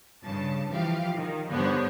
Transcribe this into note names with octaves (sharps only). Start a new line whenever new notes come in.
G2 C#3 A5
E3 F3 G4 F5
D#3
G2 D3 B3 G4 C5 C#5